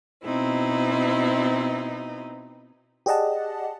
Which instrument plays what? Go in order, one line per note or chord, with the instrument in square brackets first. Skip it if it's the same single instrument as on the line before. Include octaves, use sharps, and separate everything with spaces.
[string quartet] B2 C4 D#4 E4
[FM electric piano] G4 G#4 D5 D#5 F#5 A5